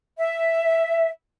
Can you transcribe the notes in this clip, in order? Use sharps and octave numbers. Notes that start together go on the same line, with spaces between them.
E5